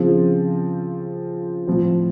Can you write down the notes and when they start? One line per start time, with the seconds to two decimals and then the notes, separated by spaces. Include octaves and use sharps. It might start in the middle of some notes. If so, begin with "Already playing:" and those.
Already playing: C#3 F3 C4
1.67 A2 F3 C4